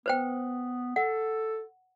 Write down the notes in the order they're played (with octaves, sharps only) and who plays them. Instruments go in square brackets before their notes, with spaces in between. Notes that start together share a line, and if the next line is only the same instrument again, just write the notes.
[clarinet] B3 [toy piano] B4 C5 G5
[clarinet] A4 [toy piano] F#5